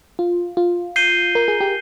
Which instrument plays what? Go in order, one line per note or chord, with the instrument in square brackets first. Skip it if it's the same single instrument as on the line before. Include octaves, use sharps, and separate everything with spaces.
[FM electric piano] F4
F4
[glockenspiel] G6 C7 D#7 G7
[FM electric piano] A#4
G#4
G4